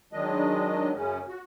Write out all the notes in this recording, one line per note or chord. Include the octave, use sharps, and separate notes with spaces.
D#3 F#3 G#3 D4 D#5
F#2 C#3 C#4
F#4